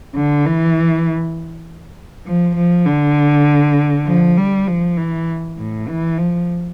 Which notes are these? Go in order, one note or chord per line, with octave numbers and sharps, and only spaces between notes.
D3
E3
F3
F3
D3
F3
G3
F3
E3
A2
E3
F3